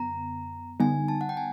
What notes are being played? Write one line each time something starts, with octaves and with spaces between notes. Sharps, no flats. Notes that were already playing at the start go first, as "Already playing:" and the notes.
Already playing: F#2 D3 B3 A#5
D3 G3 B3 D#4 G#5
A5
F#5
G5
G#5